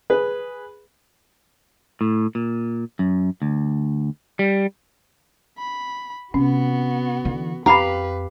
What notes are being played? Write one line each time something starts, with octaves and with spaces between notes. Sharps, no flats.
G#4 B4
A2
A#2
F#2
D2
G3
B5
C3 B3 C#4 F#4
D3 E3
F2 G4 B4 F5 A#5 B5